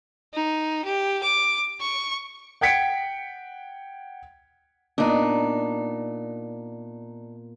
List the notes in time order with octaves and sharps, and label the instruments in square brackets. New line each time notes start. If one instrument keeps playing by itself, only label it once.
[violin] D#4
G4
D6
C#6
[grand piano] F#5 G5 G#6 B6 C#7 D7
[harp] A#2 B3 [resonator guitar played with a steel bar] D4 D#4